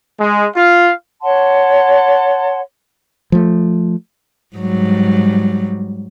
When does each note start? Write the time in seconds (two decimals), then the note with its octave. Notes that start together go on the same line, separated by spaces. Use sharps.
0.18 G#3
0.56 F4 F5
1.22 C#5 F#5 A5 C6
3.32 F3 A3
4.56 G#2 F#3 G3